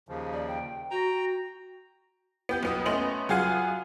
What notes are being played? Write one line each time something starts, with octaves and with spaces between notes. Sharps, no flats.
D#2 C#3 F3
D5
G5
F#4 G5 A#5
B3 G4 G6
B1 B3 D#6
A3 B3 C#4 D#5 C6 F#7
F#2 F4 G#4 F5 F#5 G#5